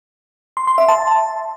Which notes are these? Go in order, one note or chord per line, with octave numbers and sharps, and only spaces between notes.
C6
C6
E5
A5